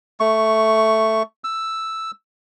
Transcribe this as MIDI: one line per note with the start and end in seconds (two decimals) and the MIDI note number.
0.20 1.23 57
0.20 1.23 85
1.44 2.11 88